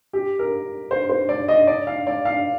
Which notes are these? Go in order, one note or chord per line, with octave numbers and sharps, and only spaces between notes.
G4
A#4
C5
C5
D5
D#5
D5
F5
D5
F5